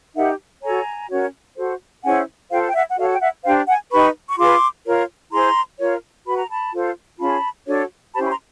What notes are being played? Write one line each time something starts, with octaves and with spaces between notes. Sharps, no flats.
D#4 G4 A#4 E5 F#5
F#4 A4 C#5 G#5 A#5
C#4 F#4 A#4 C#5
F#4 A4 C5
C#4 E4 G#4 C5 F#5 G#5
F4 A4 C5 F5 G5
G5
E5 F#5
F#5
F#4 A4 C#5 D#5 F5
G5
E5 F#5
D4 G4 C5 F5 G5
F#5 G#5
D#4 G4 B4 B5 C#6
C#6
F4 G#4 B4 C6 D6
F4 A#4 C#5
E4 G#4 C5 A#5 C6
F4 A#4 C#5
F#4 B4 B5
A#5
A5 B5
F4 A4 C5
C#4 F4 G#4 A5 B5
D4 F#4 A4 C#5
C#4 E4 G4 C5 A5 B5
B5
A#5 C6